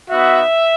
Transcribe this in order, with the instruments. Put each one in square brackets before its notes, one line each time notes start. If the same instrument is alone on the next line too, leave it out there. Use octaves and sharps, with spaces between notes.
[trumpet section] B3 D#4 F#4 E5